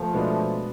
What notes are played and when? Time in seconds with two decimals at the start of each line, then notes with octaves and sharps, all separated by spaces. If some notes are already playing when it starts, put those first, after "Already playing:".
Already playing: F3 A3
0.13 B2 G#3 B3 D4